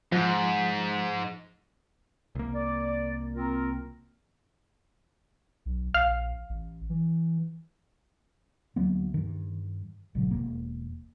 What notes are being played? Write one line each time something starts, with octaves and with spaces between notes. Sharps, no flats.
G#2 F3
C2 A#3
D5
C4 F4 A#4
B1
A#1 F5
A1
E3
D2 F#3 A#3 B3
G2 D#3
G#1 B2 D3 F#3
E1 A#3